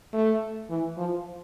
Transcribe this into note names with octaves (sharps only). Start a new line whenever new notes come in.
A3
E3
F3